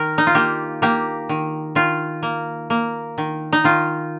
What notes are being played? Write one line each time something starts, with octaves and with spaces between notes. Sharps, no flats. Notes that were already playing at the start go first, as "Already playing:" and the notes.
Already playing: D#3 A#4
D#4
F4
A#3 G4
A#3 G4
D#3
D#3 F4
A#3
A#3
D#3
D#4
D#3 F4